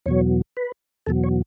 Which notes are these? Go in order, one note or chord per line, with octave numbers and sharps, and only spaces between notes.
E2 B2 F#3 C#5
B4
E2 B2 F#3 A4
C#5